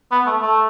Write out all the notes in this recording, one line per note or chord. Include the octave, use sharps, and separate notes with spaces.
B3
A3
A3